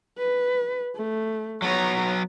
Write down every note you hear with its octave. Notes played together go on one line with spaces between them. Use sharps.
B4
A3
F#3 B3 C#5 A#5